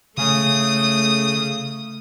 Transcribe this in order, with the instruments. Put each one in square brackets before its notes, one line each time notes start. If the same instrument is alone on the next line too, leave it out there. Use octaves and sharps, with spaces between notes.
[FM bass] C#3 [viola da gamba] A3 [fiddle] D#6